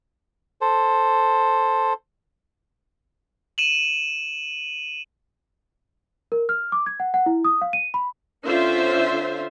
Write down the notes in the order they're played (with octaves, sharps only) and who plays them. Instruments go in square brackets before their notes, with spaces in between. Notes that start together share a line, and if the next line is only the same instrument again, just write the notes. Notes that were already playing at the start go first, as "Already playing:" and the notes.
[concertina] A4 C5
[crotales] D#7 E7 F#7
[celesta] A#4
F6
D6
G#6
F#5
F#5
E4
D#6
F5
D#7
B5
[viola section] D3 C#4 F4 C5 E5